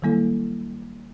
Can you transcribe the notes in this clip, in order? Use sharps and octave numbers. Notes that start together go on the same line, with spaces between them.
D#3 F#3 G3 A#3 E4 A4